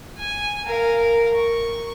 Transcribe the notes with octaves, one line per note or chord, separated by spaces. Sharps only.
G#5
A#4 F5
C#6